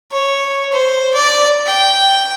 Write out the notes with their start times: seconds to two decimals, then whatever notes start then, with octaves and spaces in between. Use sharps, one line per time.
0.12 C#5
0.72 C5
1.14 D5
1.66 G5